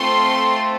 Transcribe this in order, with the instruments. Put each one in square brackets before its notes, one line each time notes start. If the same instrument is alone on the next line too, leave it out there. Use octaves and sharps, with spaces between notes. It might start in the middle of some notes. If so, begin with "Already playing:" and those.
Already playing: [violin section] A3 C4 F4 A4 C6